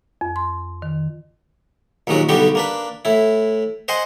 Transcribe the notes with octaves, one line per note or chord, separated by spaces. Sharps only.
F2
C6
D#3
A#1 D#2 F#3 G#3 F#4
B1 D3 G3 B3 F#4 G5
A#3 D4 B4
A2 E4
C5 D#5 F#5 G#5 C6